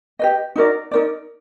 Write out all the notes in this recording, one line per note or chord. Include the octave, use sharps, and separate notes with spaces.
G4 B4 D#5
D#4 F#4 A#4 D5
D#4 F#4 A#4 D5